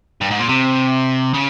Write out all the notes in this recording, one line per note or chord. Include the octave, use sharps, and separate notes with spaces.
G2
G#2
A#2
C3
C#3